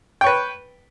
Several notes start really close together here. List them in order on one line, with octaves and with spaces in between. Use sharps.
G5 C#5 B4